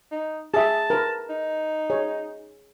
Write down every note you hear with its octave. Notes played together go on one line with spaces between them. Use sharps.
D#4
G#4 E5 A5
A#4 B4
D#4
G#4 C#5